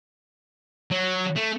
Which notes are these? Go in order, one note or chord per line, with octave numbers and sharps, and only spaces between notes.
F#3
A3